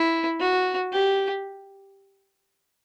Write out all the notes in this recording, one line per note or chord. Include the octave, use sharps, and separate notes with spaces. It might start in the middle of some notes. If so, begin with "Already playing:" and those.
Already playing: E4
F#4
G4